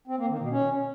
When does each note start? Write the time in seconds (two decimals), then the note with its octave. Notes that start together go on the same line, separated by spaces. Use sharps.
0.08 C4
0.18 A#3
0.29 D#3
0.39 B2
0.50 C#4